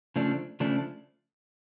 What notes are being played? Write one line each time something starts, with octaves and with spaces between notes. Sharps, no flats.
C#3 F3 A3 D4
C#3 F3 A3 D4